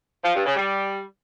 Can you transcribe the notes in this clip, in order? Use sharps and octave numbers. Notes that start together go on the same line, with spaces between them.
F3
G2
C#3
G3